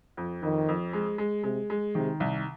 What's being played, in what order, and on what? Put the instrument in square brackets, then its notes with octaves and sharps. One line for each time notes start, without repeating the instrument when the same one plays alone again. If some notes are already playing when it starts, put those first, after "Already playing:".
[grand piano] F2
[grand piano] F2 [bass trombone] D#3
[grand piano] F2
G#3
G#3
[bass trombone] C3 [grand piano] G#3
[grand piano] G#3
[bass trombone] C3 [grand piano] D#3
[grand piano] C2